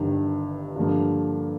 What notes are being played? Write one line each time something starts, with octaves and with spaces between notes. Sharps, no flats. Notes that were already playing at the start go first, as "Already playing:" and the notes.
Already playing: G1 G2 D#3
G2 D3 F3 A#3